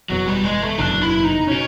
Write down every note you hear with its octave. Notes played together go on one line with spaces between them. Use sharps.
F#1 E2 B2 F#3
G3
G#3
A3
F#1 E2 B2 D4
E4
D#4
B2 C#4